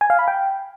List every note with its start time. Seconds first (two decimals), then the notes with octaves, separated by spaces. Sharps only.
0.01 G#5
0.10 F5
0.19 B5
0.28 G5